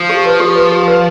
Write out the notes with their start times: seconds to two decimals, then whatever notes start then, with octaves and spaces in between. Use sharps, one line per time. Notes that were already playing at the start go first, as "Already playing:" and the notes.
Already playing: F3
0.10 G4
0.26 B4
0.40 G4
0.56 B4
0.71 G4
0.88 B4